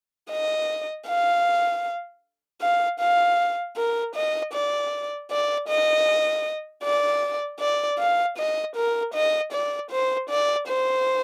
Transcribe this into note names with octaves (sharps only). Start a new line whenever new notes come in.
D#5
F5
F5
F5
A#4
D#5
D5
D5
D#5
D5
D5
F5
D#5
A#4
D#5
D5
C5
D5
C5